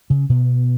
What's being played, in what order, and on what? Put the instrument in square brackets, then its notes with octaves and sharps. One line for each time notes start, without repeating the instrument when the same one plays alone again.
[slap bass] C#3 C#4
B2 B3